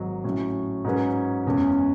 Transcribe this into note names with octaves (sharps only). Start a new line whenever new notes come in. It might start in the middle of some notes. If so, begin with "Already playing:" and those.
Already playing: G#1 G#2 F#3
A2 F#3 C#4
G#2 F#3 C#4 G#4 B4
F#1 E2 C#3 G#3 C#4